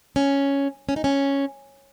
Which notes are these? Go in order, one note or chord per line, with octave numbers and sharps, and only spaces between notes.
C#4
C#4
D#4
C#4